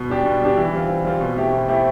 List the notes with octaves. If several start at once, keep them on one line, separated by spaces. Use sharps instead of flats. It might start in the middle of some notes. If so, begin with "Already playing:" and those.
Already playing: B2
G3 D4 G4
B2
G3 D4 G4
E3
G3 C4 F4
E3
G3 C4 F4
B2
A3 C4 E4 G4
B2
A3 C4 E4 G4